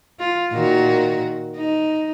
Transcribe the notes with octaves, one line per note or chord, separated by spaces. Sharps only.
F4
A#2 D#3 F#4
D#4